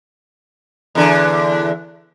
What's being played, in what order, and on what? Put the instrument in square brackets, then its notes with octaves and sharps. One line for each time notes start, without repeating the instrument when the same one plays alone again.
[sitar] E2 D3